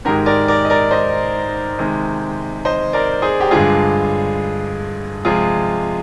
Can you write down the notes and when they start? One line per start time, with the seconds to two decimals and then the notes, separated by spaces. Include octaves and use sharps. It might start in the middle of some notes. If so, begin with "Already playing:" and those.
0.05 G#2 D#3 G#3 G4 A#4
0.26 A#4 D5
0.48 A#4 D5
0.65 D#5
0.70 A#4 D5
0.91 C5 D#5
1.79 C3 D#3 G#3
2.65 C5 D#5
2.93 A#4 D5
3.22 G#4 C5
3.40 G4
3.51 G2 D3 G#3 F4 G#4
5.25 C3 F3 G#3 F4 G#4